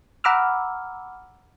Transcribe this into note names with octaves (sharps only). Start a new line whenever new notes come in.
F#5 A#5 B5 D6 E6 F6